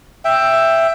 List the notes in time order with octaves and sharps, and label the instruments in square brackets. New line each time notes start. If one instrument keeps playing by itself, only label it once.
[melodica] E5 G5